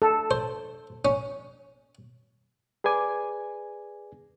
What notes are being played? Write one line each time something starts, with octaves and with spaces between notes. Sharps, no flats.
A4
C5
C#4
G#4 B4 D5 G#5 D6